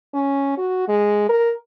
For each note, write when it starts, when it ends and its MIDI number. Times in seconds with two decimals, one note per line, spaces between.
0.14 0.55 61
0.58 0.88 66
0.88 1.26 56
1.29 1.54 70